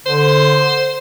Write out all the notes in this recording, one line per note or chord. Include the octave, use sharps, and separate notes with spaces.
D3 C5